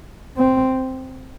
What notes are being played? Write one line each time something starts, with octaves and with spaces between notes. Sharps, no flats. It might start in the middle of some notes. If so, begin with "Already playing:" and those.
C4